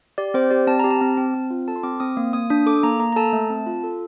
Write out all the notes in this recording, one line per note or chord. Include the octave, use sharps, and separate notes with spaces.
G4 D5
C4 C5
G4 D5
C4 A5
G4 A#5
A5
C4
C4
C4
F4
A4 A5
C6
C4 D6
C4 D#6
A#3
A#3 D#6
D4 D#6
A4 D6
A#3 A#5
A#3 A#5
A#5
A4 A5
A3
C4
F4
A4